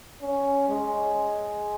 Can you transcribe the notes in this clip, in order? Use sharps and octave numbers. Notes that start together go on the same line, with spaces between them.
C#4
G#3